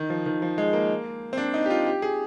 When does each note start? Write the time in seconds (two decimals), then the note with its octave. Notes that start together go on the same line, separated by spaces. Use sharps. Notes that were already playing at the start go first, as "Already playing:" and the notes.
Already playing: D#3
0.10 F3
0.26 D#3
0.42 F3
0.58 G#3
0.73 A#3
1.33 C4
1.38 D4
1.54 D#4
1.66 G4
1.70 F4
1.86 G4
2.02 G#4